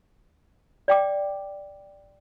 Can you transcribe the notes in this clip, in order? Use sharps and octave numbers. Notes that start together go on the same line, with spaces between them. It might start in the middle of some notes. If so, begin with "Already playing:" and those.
D5 G5 D6